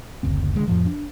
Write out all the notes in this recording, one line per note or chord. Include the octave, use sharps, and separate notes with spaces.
F#1 D2 C4
D3 G#3
F2 A2 F3
D4